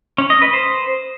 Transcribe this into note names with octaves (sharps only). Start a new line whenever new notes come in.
C#4
D#5
B4
C5